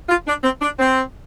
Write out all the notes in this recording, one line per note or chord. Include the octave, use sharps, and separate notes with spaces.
F4
D4
C4
D4
C4